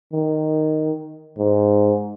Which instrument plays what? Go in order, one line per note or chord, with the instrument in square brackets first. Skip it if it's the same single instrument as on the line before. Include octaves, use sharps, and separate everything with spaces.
[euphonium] D#3
G#2